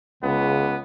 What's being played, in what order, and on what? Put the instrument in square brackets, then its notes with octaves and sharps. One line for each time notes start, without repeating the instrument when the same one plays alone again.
[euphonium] C#2 [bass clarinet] C#3 [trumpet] B3